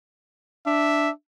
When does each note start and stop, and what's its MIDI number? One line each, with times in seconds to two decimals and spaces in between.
0.66 1.09 62
0.66 1.10 76